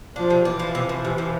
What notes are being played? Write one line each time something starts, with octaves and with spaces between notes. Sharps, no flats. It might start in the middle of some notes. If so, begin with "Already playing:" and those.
F3 D4
C3
E3 D4
F3
C3
F3
C3
F3